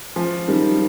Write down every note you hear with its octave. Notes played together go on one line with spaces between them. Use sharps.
F3
D#3 G3